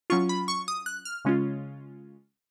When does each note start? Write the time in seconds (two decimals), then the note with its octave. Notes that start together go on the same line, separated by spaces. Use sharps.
0.10 F#3 C#4 F4 C#6
0.29 B5
0.48 C#6
0.68 D#6
0.86 F#6
1.05 F6
1.25 C#3 G#3 C#4 F4